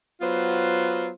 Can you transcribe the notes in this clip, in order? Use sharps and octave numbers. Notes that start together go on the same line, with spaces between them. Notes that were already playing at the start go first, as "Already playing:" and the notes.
F#3 B3 F4 C5